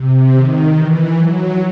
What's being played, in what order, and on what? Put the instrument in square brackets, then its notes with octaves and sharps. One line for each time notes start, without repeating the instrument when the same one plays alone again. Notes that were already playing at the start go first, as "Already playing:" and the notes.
Already playing: [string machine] C3
D#3
E3
F#3